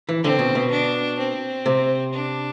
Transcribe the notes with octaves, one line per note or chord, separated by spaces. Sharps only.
E3
D3 C4
B2
B2
D4
C4
C3
D4